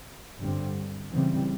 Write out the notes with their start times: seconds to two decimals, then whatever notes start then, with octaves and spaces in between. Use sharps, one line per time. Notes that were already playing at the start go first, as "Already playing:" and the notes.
0.40 G2 D3 G3 C4
1.12 C#3 E3 G3 C4